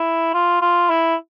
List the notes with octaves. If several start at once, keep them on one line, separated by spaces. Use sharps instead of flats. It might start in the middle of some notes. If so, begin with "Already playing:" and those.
Already playing: E4
F4
F4
E4